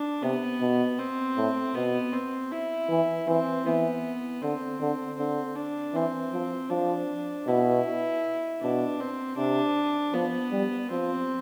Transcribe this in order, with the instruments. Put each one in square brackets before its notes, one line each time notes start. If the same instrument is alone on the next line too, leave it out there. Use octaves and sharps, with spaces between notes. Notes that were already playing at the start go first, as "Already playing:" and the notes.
Already playing: [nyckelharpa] D4
[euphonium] C3 [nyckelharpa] B3
[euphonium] B2
[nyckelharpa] C4
[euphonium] A2
[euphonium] B2 [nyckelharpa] B3
[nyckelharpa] C4
E4
[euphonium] E3
[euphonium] E3 [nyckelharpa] C4
[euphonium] E3 [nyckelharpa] B3
[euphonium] D3 [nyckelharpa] C4
[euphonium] D3
[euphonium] D3 [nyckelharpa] C4
[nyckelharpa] D4
[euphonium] E3 [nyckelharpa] C4
[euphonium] F3
[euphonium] F3 [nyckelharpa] D4
[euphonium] B2 [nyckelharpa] E4
[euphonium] B2 [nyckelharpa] D4
[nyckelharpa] C4
[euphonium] C3 [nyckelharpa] D4
[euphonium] F3 [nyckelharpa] B3
[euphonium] G3
[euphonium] F3 [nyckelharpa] C4